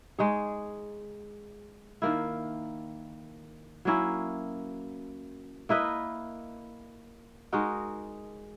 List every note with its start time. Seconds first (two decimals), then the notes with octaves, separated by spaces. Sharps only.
0.19 G#3 D#4 G#4 C#5
2.02 D#3 A#3 E4
3.85 F#3 A#3 C#4 E4
5.69 A#3 E4 B4 D#5
7.52 G#3 D#4 F#4 A#4